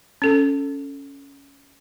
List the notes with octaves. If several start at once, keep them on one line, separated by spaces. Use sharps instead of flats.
C#4 A4